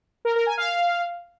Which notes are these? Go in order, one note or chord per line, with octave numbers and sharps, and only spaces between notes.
A#4
A#4
G#5
F5